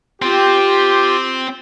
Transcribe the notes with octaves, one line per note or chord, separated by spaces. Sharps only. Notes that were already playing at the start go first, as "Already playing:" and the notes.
C4 F4 G4